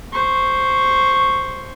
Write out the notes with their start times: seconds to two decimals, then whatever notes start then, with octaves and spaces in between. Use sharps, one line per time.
0.12 C5 C#6